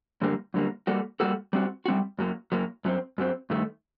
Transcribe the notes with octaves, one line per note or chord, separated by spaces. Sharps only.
F#2 D3 G3 A#3
F#2 D3 G3 A#3
G3 A#3 F#4 A4
G3 A#3 F#4 A4
G3 C4 F#4
G3 C4 F#4
F#2 F#3 A#3
F#2 F#3 A#3
F#2 F#3 C4
F#2 F#3 C4
G2 D#3 A3